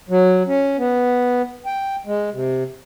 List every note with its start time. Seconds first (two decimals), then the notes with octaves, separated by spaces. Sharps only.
0.09 F#3
0.47 C#4
0.78 B3
1.66 G5
2.06 G#3
2.33 C3